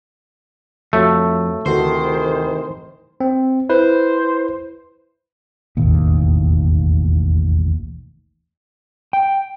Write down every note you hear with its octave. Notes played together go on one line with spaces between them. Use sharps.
F2 A3 F#4 C#5 E5
D2 C3 D#3 E3 F#4 A4 C5
C4
E4 B4 C5
E1 A1 D#2
G5